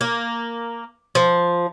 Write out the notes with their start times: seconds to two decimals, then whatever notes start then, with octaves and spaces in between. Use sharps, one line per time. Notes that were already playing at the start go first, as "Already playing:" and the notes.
0.01 A#3
1.15 F3